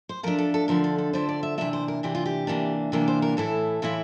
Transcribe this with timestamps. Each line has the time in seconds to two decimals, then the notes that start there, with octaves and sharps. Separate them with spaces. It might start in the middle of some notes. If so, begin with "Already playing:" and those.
0.09 C5
0.23 F3 A3 D4 A#4
0.39 A4
0.54 A4
0.68 D3 F3 A3 D4 A#4
0.84 A4
0.98 A4
1.13 D3 F3 A3 D4 C5
1.29 D5
1.43 E5
1.58 C3 E3 A#3 D4 E5
1.73 C5
1.88 A#4
2.03 C3 E3 A#3 D4 G4
2.15 F4
2.26 G4
2.47 C3 E3 A#3 D4
2.92 C3 E3 A#3 D4 A#4
3.08 C5
3.22 A#4
3.37 A2 E3 A3 E4 A4
3.82 A2 E3 A3 E4 F4